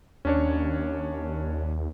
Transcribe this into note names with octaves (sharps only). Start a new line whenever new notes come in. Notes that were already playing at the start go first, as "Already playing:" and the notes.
D#2 C#4 D4 C#5